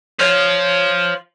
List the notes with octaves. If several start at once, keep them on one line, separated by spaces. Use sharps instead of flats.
C5 C#5 F5